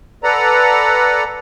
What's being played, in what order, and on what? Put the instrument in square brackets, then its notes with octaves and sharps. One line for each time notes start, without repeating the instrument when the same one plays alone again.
[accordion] A4 B4 D5 F#5 A#5